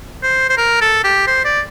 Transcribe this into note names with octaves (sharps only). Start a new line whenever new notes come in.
C5
C5
A#4
A4
G4
C5
D5